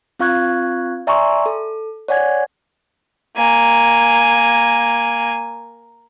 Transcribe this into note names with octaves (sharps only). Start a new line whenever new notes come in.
C4 F4 F5 C#6 F#6 G#6
D5 E5 G#5 A#5 C6 C#6
A4
C#5 D5 F#5 G#5 G#6
A#3 G#5